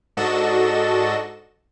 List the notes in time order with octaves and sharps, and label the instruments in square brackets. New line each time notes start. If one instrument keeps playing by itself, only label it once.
[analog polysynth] G#2 D4 F#4 A4 D#5 E7